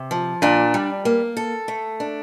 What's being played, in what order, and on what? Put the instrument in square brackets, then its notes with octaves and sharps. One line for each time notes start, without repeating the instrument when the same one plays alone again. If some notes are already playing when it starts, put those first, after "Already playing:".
Already playing: [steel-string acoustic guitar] C3
F3
[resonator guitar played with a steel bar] A#2 [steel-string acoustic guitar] D4
[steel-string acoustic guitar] G3
A#3
A4
A3
D4